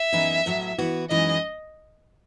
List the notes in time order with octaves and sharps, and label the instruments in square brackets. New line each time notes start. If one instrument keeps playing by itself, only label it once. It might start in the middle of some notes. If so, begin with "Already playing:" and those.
Already playing: [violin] E5
[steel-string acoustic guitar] F#2 E3 B3 D#4 G#4
A2 F#3 B3
E3 B3 F#4
[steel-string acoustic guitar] F#2 E3 G#3 D#4 G#4 [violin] D#5